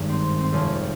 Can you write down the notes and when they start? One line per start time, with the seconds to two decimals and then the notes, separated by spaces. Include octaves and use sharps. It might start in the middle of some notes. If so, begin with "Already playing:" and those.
Already playing: G#1 G2 D#3 D#4
0.09 C4
0.40 C4
0.52 F1 F2 D#3 C#4